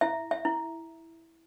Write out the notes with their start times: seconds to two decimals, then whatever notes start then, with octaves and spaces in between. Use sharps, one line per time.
0.01 E4 E5
0.31 E5
0.45 E4